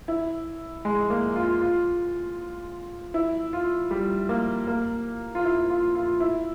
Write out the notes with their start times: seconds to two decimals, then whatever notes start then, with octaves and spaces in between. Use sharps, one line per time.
0.08 E4
0.85 G#3
1.10 A#3
1.36 F4
1.61 F4
3.14 E4
3.53 F4
3.91 G3
4.29 A#3
4.67 A#3
5.35 F4
5.44 E4
5.69 F4
5.95 F4
6.20 E4